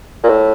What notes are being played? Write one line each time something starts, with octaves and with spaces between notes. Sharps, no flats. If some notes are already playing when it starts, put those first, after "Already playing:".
A#2
A2